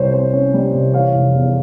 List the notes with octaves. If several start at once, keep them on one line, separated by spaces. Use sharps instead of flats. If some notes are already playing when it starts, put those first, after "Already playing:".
Already playing: C2 G3 C5 C#5
C3 C5
C#4 C#5
G3
C2
E3 C#5 F5
F1
E2